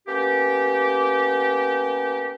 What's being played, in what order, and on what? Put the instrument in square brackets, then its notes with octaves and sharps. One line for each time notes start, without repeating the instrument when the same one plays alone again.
[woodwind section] A#3 B3 C#4 G4